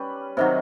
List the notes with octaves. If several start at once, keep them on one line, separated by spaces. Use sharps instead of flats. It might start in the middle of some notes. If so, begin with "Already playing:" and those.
Already playing: G3 C#4 G4 B4
C3 D#3 F#3